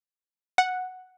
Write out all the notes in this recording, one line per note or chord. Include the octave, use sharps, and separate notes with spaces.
F#5